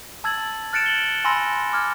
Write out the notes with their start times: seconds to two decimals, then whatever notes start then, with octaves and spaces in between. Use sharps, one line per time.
0.24 A5 E6 G#6 A6 F#7
0.73 F6 F#6 A6 C#7 D7 E7
0.86 G#6 F#7 G7
1.25 G#5 B5 C6 E6 A#6
1.73 D6 F6 G#6